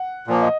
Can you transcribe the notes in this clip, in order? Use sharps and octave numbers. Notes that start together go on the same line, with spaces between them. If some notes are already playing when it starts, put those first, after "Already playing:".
Already playing: F#5
A#2 F3 A#3
D#5